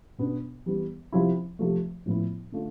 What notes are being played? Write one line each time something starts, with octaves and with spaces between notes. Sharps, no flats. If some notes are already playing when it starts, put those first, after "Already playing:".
B2 B3 D4
E3 G3 B3
C3 F3 C4 E4
C3 F3 A3
A2 F3 B3 E4
D3 A3 D4 F4